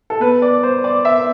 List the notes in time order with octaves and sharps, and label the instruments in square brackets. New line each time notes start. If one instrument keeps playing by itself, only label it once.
[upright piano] A4
[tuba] B3 [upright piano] B4
[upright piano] D5
C5
D5
E5